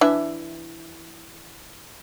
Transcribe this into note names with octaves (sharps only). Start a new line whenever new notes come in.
E3 D4 E5